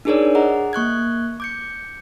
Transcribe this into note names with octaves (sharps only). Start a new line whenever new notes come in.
D4 D#4 G#4 A#4 C#5 D5
G#4 D#5 F#5 A#5
A#3 C#6 F#6 G#6
D6 G6 C#7